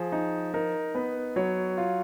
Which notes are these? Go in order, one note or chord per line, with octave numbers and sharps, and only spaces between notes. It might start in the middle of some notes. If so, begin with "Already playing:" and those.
Already playing: F3 G#4
D#4
D#4 A#4
B3 B4
F#3 C#5
F4